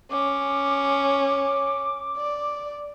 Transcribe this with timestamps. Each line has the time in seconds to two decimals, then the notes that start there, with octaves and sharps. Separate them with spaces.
0.11 C#4 D6
2.17 D5